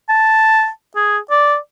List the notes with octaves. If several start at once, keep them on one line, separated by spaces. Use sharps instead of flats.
A5
G#4
D5